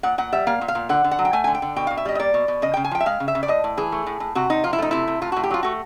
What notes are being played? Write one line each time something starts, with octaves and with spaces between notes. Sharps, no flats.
A#2 F#5
A#2 F#5
G3 E5
A#3 F5
A#2
F5
A#2
D3 F#5
D3
F#5
F#3
G5
A3 G#5
D3 G#5
G5
D3
B2 G5
B2 F5
E5
G3 D#5
D#5
A#3 D5
B2
B2
C#3 D#5
C#3 G5
G#5
F3 G5
E5
G#3 F5
C#3
E5
C#3
D5
A2 D#5
A2
E3 G#4
A3
A2
A2
C3 F#4
C3 D#4
F3 F4
E4
A3 D#4
C3 E4
C3
A2 F4
A2 F#4
G4
F#3 F4
A3 F#4